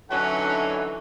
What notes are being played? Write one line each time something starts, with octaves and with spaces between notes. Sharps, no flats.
D3 E3 F#3 C#4 D#4 F#5